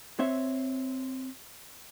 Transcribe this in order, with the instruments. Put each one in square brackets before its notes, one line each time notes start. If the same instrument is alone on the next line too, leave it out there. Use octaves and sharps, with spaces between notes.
[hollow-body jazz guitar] C4 C#5 E5